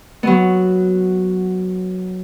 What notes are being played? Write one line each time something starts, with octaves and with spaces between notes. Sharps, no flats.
F#3 B3